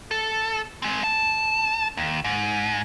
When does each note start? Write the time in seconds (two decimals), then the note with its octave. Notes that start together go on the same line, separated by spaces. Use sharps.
0.11 A4
0.82 G#3 C4
1.04 A5
1.97 D#2
2.24 G#2